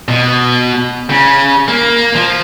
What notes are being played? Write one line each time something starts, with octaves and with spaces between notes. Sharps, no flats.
B2
C#3
A#3
F3